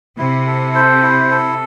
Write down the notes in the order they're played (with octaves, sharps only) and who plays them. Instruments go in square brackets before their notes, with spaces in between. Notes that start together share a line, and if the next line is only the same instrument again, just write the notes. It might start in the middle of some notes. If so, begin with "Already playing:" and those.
[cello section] C3 [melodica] E4
[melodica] A4
C5
E4
A4